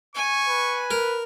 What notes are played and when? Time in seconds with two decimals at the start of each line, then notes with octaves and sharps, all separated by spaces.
0.16 G#5 C#6
0.48 B4
0.91 A#4